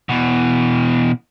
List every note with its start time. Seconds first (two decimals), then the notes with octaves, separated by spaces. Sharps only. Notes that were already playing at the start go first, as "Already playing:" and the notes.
0.09 B2 E3